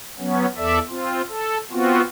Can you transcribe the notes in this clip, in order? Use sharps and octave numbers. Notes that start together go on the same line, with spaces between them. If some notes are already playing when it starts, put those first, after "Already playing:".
F#3 B3 C#4
E2 A4 D5 E5
C4 F4
A4
B3 C4 F4 F#4